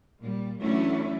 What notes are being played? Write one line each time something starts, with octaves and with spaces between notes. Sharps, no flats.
A#2 G3
E3 F#3 A3 C#4 D4 E4